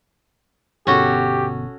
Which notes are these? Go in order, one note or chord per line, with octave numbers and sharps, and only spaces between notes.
G1 B2 C#4 F#4 G4 A4